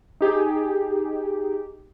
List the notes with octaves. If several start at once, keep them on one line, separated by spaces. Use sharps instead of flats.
D#4 G4 G#4